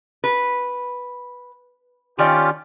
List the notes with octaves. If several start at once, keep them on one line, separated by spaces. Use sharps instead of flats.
B4
D#3 C#4 F4 G4 D5 G5